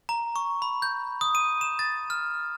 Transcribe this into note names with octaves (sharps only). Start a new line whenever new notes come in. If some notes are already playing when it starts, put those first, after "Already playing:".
A#5
C#6
B5
G6
D#6
D#7
E7
A6
F6